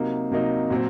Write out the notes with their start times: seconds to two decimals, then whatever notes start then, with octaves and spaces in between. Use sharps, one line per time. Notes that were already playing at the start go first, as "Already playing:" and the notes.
Already playing: C3 F#3 A#3 D#4
0.31 C3 F#3 A#3 D#4
0.70 A#2 F#3 C4